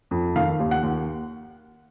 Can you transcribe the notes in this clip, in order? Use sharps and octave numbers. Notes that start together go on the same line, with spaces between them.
F2
D#3 F5
D#2
F#5
D#2